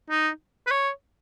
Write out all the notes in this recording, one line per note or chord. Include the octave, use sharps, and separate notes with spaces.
D#4
B4
C#5